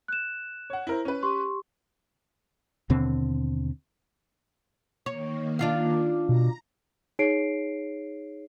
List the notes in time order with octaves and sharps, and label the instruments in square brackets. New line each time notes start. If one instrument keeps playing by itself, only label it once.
[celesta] F#6 E7
[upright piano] C#5 F#5
E4 A#4 C5
C#4 B4
[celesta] G4 C6 C#6
[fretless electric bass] D#2 B2 D3 C4
[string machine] D#3 A#3 [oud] C#5
[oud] D4 F4 F5
[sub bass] B2 [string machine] A#5
[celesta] D#4 G#4 C#5 C7 D7